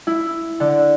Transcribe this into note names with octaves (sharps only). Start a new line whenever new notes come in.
E4
D3